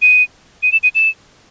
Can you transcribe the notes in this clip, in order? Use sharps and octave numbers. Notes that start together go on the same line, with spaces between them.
D#7
D#7
E7
D#7
E7